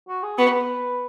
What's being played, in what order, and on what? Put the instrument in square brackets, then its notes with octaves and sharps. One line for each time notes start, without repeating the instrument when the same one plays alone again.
[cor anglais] F#4
G#4
[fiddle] B3 [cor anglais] F#4
[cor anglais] B4